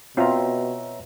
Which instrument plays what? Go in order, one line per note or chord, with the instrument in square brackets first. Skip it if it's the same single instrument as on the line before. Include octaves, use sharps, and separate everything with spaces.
[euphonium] B2 [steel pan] C4 F4 [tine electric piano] C#5 E5 A#5